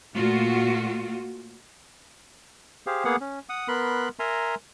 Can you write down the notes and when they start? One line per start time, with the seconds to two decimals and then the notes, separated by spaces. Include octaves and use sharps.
0.14 A#2 A3 F4 F#4
2.87 G4 G#4 C5 F5
3.05 A#3 B3 G#4 F5 F#5
3.21 C#4
3.49 F#5 D#6
3.68 B3 A#4 B5 C6 F#6
4.19 A#4 E5 G#5 A#5 C6